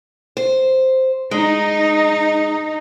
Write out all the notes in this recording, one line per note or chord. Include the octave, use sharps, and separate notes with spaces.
C5
G#3 D#4